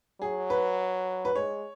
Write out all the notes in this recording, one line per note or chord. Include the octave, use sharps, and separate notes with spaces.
F#3 G#4
B4
B4
G#3 C#5